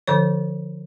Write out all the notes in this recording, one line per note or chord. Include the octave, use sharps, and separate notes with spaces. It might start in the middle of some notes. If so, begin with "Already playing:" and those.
D3 F3 C#5